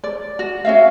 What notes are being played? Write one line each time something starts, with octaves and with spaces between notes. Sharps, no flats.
D5
F#4
C#4 D4 E5 F5